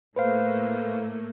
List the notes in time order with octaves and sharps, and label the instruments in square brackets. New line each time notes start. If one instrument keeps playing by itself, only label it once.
[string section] A2 A3 A#3 [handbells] B4 C5 F5